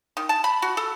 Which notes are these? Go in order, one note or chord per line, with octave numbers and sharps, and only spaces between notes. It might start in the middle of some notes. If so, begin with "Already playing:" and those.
D#3
A5
B5
F#4
A4